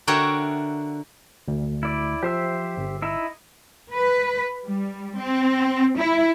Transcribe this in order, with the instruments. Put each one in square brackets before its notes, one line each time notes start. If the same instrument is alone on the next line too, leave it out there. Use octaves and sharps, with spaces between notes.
[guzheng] D3 F#4 A#4 C#5 E5 G5
[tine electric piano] D2
[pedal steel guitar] E4 D5
[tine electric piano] F3 [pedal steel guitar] G4 C5 E5
[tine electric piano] G1
[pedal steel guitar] D#4 E4 E5
[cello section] B4
G3
C4
E4